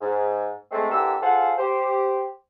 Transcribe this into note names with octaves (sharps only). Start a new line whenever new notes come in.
G#2
G#3 A3 C4
D3 E3 A#3 G4 A#5 E6
F4 G#4 A4 C5 F5 F#5
G4 C5